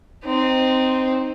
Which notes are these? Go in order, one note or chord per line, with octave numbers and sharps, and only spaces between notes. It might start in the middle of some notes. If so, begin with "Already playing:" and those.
C4 D#4